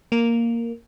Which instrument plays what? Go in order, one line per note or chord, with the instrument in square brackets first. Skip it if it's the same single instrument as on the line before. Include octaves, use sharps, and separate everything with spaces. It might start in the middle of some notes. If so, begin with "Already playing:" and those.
[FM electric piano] A#3